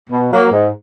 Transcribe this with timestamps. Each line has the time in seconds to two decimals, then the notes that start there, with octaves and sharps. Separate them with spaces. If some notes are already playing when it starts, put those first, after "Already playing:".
0.10 B2
0.31 F#3 A#3
0.51 G#2